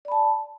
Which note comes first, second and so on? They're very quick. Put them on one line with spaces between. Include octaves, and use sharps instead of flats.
D5 B5 A5